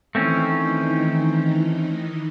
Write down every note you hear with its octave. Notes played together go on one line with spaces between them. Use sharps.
D#3 E3 A3 C4 C#4 D#4